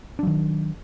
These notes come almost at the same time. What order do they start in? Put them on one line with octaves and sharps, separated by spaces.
D4 F#3 D#3